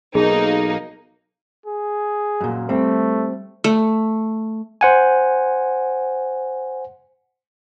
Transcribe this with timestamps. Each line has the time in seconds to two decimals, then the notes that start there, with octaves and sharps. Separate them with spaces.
0.15 B1 A#3 D#4 G#4
1.66 G#4
2.41 F#2 A#2
2.69 G3 A3 C4
3.64 A3
4.81 C5 F#5 G#5